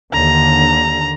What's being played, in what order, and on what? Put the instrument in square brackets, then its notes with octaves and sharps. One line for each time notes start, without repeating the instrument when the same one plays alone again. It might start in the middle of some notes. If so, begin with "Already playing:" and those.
[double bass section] D#2 D3 [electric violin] A#5